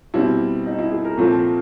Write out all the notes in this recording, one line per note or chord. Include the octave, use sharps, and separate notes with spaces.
B2 G3 C4 E4
D#4
E4
G#4
A#4
A#2 F3 A3 C4